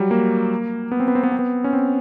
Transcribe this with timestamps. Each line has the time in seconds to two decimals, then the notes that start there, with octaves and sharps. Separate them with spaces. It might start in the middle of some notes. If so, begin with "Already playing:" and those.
Already playing: F#3 G3
0.11 A#3
0.92 B3
1.00 C4
1.08 B3
1.15 C4
1.23 B3
1.32 C4
1.39 B3
1.64 C#4
1.73 C4